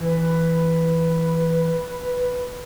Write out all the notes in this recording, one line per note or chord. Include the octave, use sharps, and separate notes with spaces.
E3 B4